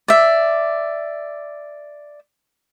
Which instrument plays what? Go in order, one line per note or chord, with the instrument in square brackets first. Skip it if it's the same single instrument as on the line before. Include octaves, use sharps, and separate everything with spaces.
[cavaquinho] D5 E5